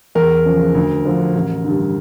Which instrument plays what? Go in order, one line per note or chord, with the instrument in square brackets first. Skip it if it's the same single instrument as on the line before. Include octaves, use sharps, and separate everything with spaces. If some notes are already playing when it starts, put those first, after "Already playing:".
[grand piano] E2 A#4
C#3 F3
D2
D3 F3
A1
G2 D3